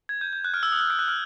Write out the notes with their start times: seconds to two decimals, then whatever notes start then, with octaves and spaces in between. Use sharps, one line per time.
0.09 G#6
0.21 G6
0.33 G6
0.45 F#6
0.54 F6
0.63 E6
0.72 D#6
0.80 E6
0.90 F6
0.99 F#6
1.08 F6